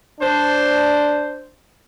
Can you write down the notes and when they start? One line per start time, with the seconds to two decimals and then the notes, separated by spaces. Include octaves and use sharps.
0.20 D4 C5